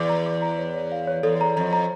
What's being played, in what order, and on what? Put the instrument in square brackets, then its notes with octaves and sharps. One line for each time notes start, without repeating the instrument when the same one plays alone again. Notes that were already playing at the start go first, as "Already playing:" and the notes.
Already playing: [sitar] E2 [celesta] D6
[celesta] A#5
D6
A#5
C#5
C#5
F5
C#5
[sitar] E2 [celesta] A4
[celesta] A#5
[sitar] F2 [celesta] A#5
[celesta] A#5